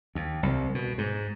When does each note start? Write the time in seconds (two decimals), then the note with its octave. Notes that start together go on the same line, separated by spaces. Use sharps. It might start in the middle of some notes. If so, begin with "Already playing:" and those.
0.15 D#2
0.43 C2
0.75 B2
0.98 G#2